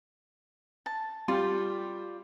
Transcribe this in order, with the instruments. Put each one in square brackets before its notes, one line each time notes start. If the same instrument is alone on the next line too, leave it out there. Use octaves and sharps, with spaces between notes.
[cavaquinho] A5
[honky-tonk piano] G3 G4 [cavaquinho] F4 D5 C6